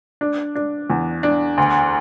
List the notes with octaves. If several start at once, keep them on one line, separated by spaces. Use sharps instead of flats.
D4
D4
E2
D4
D2